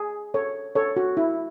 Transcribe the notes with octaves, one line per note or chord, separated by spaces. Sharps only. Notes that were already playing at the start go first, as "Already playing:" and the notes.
Already playing: G#4
A4 C#5
A4 C#5
F#4
E4